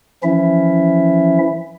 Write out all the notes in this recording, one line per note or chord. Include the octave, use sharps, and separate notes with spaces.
E3 F3 C#4 E4 E5